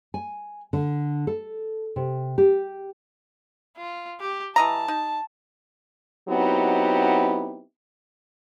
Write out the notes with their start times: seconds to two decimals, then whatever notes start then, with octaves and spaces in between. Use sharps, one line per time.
0.14 G#5
0.73 D3
1.27 A4
1.96 C3
2.38 G4
3.77 F4
4.21 G4
4.56 E3 D#5 A5 A#5
4.88 D#4
6.29 F#3 B3 C4 D#4 E4 G4